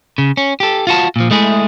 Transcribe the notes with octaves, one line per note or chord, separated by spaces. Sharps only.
C#3
C#4
G4 A4
F4 F#4 A5
A#2 F3
G#3 A3 E4 G#4